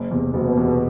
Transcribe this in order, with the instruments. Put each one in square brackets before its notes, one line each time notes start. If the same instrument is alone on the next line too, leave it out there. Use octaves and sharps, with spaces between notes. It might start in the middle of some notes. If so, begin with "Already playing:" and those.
Already playing: [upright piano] F#1
E2 C3
[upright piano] F#1 [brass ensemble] B2
[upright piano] E2 C3